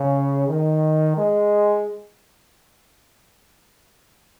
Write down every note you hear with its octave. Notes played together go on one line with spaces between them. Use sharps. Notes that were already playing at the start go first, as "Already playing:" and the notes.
Already playing: C#3
D#3
G#3